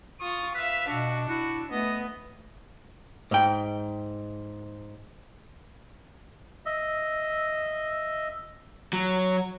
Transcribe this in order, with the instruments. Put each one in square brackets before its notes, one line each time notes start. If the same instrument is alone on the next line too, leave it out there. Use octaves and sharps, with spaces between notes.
[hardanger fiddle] F4 D#6 [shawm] C#6
[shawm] B4 [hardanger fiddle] E5 F5
[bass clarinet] B2 [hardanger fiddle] D4 [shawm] F#4
[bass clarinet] E4 [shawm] F#4
[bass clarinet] A3 [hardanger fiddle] B3 [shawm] D#5
[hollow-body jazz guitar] G#2 G5
[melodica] D#5 E5
[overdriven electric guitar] F#3